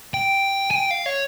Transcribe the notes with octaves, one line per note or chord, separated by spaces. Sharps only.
G5
G#5
G5
F5
C#5